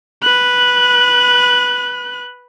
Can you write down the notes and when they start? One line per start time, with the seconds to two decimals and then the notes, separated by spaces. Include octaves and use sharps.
0.22 B4 F#6